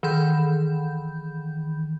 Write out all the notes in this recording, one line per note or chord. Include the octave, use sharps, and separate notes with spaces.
D#3 E3 B5 G6